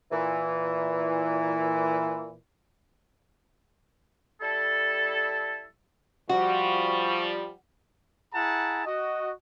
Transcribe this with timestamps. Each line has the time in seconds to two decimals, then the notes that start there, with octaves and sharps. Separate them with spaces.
0.12 A#2 E3
4.41 G3 E4 A4
6.29 F3 G3 F#4 C#6
8.34 E4 G#4 F#5 A5 A#5
8.86 F#4 D#5